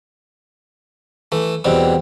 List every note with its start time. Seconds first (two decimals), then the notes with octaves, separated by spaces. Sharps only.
1.32 E3 A3
1.64 E2 B2 G3 C4